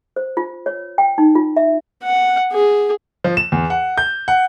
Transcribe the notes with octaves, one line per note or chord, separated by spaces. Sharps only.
C5
F4
C#5
G5
D#4
F4
E5
F#5
G#4
F3
E7
E2
F#5
G6
F#5